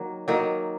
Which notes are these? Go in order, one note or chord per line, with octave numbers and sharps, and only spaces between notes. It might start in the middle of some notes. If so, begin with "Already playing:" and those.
Already playing: D#3 F#3 A#3
D#3 F#3 A#3